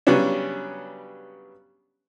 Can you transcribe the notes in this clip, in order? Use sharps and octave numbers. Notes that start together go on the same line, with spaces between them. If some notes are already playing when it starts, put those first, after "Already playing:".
C#3 F#3 G3 B3 C#4 D4